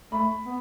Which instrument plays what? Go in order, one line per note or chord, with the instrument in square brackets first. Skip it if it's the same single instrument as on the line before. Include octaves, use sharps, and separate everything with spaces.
[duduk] A3 [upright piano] B5
[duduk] B3